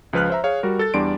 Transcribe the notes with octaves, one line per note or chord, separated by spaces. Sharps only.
C#2 F3 B4 F6 F#6
C5 E5 A#5
G#4 C#5 F5
G3 F#4 A#4
A4 A6
E2 G3 D4 D5 C6 D7